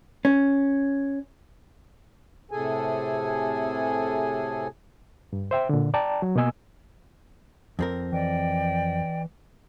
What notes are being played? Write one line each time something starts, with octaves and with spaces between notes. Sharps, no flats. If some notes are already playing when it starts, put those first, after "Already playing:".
C#4
A2 C3 G#4 A4 G#5
G2
C5 E5 G5
A#2 D3
D5 G5 A5 A#5
F#3
B2 A#3 B3 D#5 G#5 E6
F2 C4 A#4
E3 D5 D#5 G5